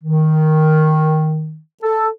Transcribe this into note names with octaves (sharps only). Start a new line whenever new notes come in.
D#3
A4